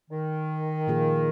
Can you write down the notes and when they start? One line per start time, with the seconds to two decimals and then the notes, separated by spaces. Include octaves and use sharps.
0.10 D#3
0.87 A#2 F3 A#3 F4 G#4